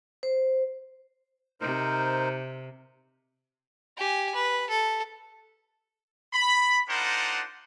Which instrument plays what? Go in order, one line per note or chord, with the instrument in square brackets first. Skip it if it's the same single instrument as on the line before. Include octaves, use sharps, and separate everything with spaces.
[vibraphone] C5
[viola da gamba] C3 [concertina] D#4 A#4 C5
[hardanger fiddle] G4 G#5
B4
A4
[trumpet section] B5
D4 D#4 F4 A#4 C5 F#5